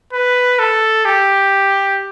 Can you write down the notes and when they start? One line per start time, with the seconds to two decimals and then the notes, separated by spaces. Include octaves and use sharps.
0.13 B4
0.59 A4
1.05 G4